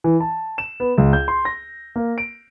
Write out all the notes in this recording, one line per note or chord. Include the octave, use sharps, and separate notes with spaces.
E3
A5
E7
B3
C#2
G6
C6
A#6
A#3
D7